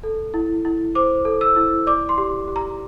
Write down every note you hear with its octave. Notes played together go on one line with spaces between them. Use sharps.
A4
E4
E4
C5 D6
A4
E6
E4
D5 D6
C6
G4
G4
A#5